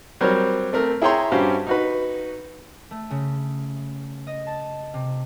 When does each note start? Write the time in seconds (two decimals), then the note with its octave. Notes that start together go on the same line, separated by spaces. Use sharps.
0.21 F#3 G3 C4 A#4 C5 C#5
0.73 A3 C4 A#4
1.02 E4 G#4 C#5 G5 A#5 C6
1.32 G2 C#4 F#4 G4 C5 F5
1.67 D#4 F#4 B4
2.91 A3
3.10 C#3
4.27 D#5
4.47 A5
4.94 C3